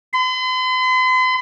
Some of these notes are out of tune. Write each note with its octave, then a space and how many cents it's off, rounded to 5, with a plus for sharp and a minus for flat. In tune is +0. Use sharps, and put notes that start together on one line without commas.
C6 -45